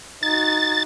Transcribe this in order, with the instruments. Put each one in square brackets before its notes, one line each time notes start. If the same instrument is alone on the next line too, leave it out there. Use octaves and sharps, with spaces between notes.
[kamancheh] D#4 F#4 [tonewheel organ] A6